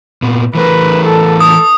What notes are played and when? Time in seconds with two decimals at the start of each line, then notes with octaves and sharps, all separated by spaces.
0.22 A#2 B3
0.55 E3 A3 A#4 B4
1.05 A4
1.40 D#6